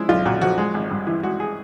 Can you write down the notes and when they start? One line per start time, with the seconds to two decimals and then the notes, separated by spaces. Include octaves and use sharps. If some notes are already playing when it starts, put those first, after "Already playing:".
Already playing: F3 G#3 E4
0.09 B1 F4
0.25 A#2 F#4
0.41 F3 F#4
0.58 G#3
0.74 G#1
0.91 G2
1.07 E3
1.23 G#3 F#4
1.40 G#4